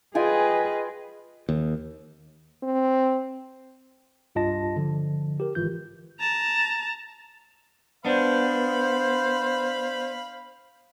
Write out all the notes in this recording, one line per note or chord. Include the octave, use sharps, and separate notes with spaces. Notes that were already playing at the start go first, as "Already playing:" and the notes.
F4 G#4 B4 D#5 G5 G#5
D#2
C4
C2 G2 F4 D#5 A5 A#6
D3 F3
G4 A#4
G#1 E3 F4 G6
A5 A#5
B3 D4 C5 F5 B5